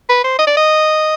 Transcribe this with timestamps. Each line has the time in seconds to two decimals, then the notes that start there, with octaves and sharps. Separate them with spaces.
0.09 B4
0.24 C5
0.39 D#5
0.47 D5
0.57 D#5